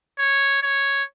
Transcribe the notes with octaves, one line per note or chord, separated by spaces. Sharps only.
C#5
C#5